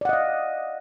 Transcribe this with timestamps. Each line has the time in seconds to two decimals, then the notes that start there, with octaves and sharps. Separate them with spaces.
0.01 D5
0.05 F#5
0.09 D#5
0.13 F5